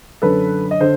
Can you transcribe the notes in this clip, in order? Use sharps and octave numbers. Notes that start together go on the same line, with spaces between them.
F#2 D3 A4 B4
D#5
D3 C5